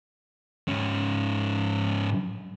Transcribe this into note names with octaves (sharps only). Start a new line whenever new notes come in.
G#2 C#4